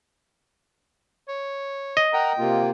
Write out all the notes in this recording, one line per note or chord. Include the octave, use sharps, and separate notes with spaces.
C#5
D#5
A#4 F#5 G5 A#5
C3 A#3 F4